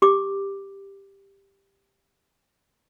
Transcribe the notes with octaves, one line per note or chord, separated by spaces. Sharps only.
G4 D6